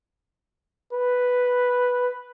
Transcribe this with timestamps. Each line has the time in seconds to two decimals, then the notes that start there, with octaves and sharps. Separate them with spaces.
0.93 B4